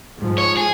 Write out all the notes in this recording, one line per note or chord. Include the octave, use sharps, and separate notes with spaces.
G#2 F3 G#3
C#5
G#4